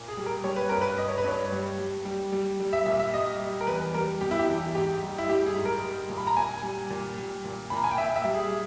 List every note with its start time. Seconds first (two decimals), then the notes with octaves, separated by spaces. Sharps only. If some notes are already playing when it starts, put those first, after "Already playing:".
Already playing: A#2
0.08 G#4
0.17 G3
0.26 A#4
0.44 G3 C#5
0.56 B4
0.69 G2 A#4
0.81 B4
0.98 G2 D#5
1.08 C#5
1.18 B4
1.24 G2 C#5
1.52 G3
1.79 G3
2.05 G3
2.32 G3
2.60 G3
2.73 E5
2.86 A#2 E5
3.00 E5
3.13 G3 D#5
3.40 G3
3.61 A#4
3.67 E2 B4
3.94 G3 A#4
4.21 B2 G4
4.31 E4
4.39 G4
4.49 E2
4.75 G#2 G4
5.02 G3
5.18 E4
5.28 G3 G4
5.47 G#4
5.56 G#2
5.65 A#4
5.83 G3
6.09 A#2
6.17 B5
6.27 A#5
6.37 A#2 G#5
6.63 G3
6.90 A#2
7.17 G3
7.45 A#2
7.70 A#2 B5
7.77 A#5
7.84 G#5
7.91 G5
7.98 A#2 E5
8.16 E5
8.24 G3
8.34 G#4